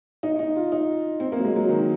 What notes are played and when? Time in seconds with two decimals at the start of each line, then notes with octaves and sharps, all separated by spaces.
0.23 D#4
0.39 D#4
0.56 F4
0.72 D#4
1.20 C4
1.32 A#3
1.39 F#3
1.45 G#3
1.56 F#3
1.69 D#3